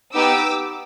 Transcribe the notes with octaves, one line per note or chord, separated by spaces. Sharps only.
B3 D#4 G4 D6 E6